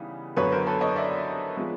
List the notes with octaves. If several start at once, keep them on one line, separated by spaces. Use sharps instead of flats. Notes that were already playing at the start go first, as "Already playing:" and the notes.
Already playing: C#3 E3 G3 B3 D#4
F#2 D3 F#3 B3 B4 C#5
A#4 C5
A4 B4
C#5 D#5
D5 E5
F3 G#3 B3